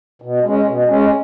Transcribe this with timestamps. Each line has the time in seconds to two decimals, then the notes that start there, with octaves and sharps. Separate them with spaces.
0.22 B2
0.44 G#3 C#4
0.66 B2
0.88 G#3 C#4